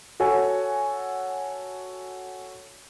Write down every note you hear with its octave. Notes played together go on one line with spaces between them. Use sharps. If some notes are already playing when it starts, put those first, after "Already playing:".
F#4 A4 C#5 G#5